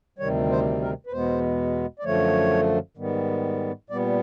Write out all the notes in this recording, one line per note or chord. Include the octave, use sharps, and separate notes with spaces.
D2 C3 D#3 G3 C#5
C5
A#4
B4
E2 B2 G#3 B3 C5
D5
F#2 D3 F3 A3 C#5
G#2 D#3 G3 B3
A#2 G3 B3 D5